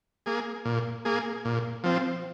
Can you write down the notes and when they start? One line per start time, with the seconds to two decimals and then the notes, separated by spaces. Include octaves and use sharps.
0.26 A#3 G#4
0.65 A#2
1.05 A#3 G#4
1.45 A#2
1.84 F3 C4